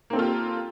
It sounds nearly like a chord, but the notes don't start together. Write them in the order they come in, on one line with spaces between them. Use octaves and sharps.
A#3 C4 A4 F4 G4